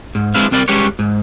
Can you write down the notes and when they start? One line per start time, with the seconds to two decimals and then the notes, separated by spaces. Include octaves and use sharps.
0.15 G#2
0.34 G#3 C4 D4 E4 B4 F5
0.51 C2 C4 A#4 D5 B5
0.68 G3 G#3 C#4 G4 B4 C#5
0.99 G#2